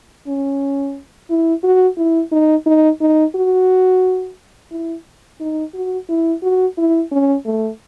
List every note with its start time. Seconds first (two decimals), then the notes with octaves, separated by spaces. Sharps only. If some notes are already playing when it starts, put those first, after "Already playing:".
0.27 C#4
1.30 E4
1.64 F#4
1.98 E4
2.32 D#4
2.66 D#4
3.01 D#4
3.36 F#4
4.71 E4
5.40 D#4
5.74 F#4
6.09 E4
6.42 F#4
6.78 E4
7.12 C#4
7.45 A3